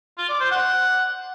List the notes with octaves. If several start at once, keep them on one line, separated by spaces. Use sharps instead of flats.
F4
D5
C5
F#5